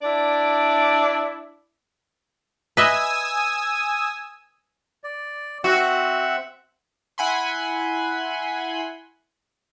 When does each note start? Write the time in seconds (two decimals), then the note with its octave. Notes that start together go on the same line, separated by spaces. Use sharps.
0.02 D4 E4 D5
2.77 B4 D#5 E5 G#5 D#6 E6
5.04 D5
5.64 C4 F#4 E5 F#5
7.18 E4 F#5 G#5 B5 C6